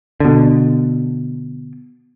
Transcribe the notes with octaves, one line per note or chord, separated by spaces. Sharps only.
B2 D3